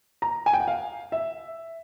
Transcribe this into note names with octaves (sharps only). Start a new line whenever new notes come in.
A#5
G#5
G5
F#5
F5
E5